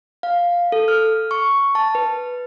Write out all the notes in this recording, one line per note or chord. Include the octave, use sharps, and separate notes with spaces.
F5
A4
F6
C#6
A5
B4